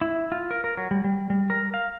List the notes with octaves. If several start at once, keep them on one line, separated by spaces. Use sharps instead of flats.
E4
F4
A#4
A#4
F#3
G3
G3
G3
A#4
F5